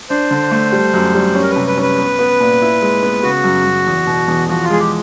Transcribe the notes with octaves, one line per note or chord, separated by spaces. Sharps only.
D4 C5
D3
A3
G3
F#2
G3
C#4
A#4
B4
C3
B4
C#4 B4
B3
B3
A#2
E4
G#3
B3
C#3 F#4
F#2
F#2
E2
B2
E2
F3 F#4
F4
G#3 G#4
G4